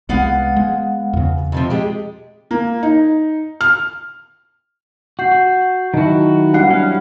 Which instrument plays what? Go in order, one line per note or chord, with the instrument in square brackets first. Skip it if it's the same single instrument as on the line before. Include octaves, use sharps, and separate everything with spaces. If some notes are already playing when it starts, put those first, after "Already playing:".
[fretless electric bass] C2 F#3 G#3 [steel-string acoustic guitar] B3 F5 F#5
[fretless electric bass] G#3
E2 C#3
[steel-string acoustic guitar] F2 C3 F3
G#3 G4
[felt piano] A#3
D#4
F6
[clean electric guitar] F#4 [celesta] F#5 G6 C7
[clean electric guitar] F#4
[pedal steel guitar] D#3 F#4 [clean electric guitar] F#3 E4 [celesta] D#5 A5
[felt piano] G3 F#5 [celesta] D4 C7
[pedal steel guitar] C#4 F5